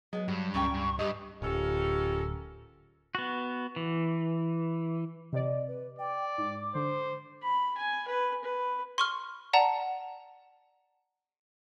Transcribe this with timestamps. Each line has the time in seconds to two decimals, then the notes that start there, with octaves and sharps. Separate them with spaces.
0.13 F#3 G#3 B3
0.28 G2 F#4
0.54 C#2 A#2 C#4 G5 C#6
0.74 G2
0.99 G2 G4 D#5
1.42 D1 G#2 C#4 F4 G4 A4 A#4
3.15 B3 F#4
3.76 E3
5.33 C3 D5 D#5
5.68 B4
5.99 D5 G5
6.38 G#2 D6
6.75 D3 C5
7.42 B5
7.77 G#5
8.08 B4
8.43 B4
8.98 C6 C#6 F6
9.53 D5 F#5 A5 A#5